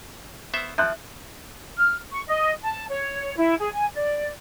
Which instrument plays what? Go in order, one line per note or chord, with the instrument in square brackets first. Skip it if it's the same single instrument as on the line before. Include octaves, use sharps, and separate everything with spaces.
[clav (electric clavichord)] B3 C5 E5 [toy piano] C#6 E6
[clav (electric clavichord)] F3 [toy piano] E5 [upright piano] F#6 G6
[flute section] F6
C#6
D#5
A5
C#5
E4
G#4
G#5
D5